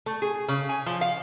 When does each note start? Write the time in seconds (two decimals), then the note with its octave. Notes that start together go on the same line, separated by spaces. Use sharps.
0.06 A3
0.22 G#4
0.48 C#3
0.69 G#5
0.86 F3
1.01 F5